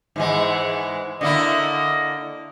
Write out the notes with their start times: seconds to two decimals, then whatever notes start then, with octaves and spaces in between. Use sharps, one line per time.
0.16 G#2 E3 G#3
1.21 D3 A#3 E4 D#5